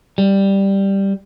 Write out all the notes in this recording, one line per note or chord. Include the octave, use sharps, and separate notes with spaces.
G3